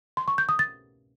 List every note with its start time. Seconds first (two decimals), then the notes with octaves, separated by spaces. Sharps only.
0.17 C6
0.28 C#6
0.38 G6
0.49 D#6
0.59 A6